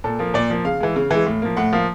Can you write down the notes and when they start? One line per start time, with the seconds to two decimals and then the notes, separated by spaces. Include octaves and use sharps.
0.04 A#2 A4
0.19 F3 A#3
0.34 A#2 D5
0.50 F3 A#3
0.65 C#3 F5
0.80 E3 G#3
0.96 C#3
1.11 E3 G#3
1.27 A2
1.42 F3 A#3
1.57 A2 F#5
1.73 F3 A#3 F5